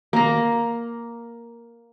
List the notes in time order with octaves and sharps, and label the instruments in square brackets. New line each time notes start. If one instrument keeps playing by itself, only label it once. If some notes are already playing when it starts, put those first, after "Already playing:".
[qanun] A#3 A#5